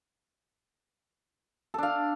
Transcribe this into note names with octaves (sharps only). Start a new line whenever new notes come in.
D4 A4 F5